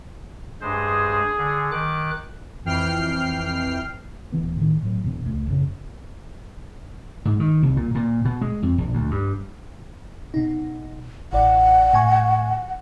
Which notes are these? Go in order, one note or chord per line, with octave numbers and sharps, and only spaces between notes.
G2 G#3 G#4 C5
D3
D#3 D6 F#6
F2 E3 G5 F6 C7
D1 E3 B3
A2 D#3
A2 F#3
E2 B2
C#2 A3
A1 F#2 C#3
G#2
D#3
C2
A#2
A#2
B2
G#3
F2
A#1
D2
G2
B2 D#4
A1 D5 F#5
A2 G#5 C#6